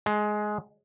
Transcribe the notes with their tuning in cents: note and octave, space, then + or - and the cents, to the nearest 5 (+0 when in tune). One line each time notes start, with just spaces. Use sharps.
G#3 +15